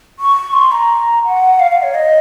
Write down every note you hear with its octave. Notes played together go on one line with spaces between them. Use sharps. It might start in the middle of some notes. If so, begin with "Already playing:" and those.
C#6
C6
A#5
F#5
F5
F5
C#5
D#5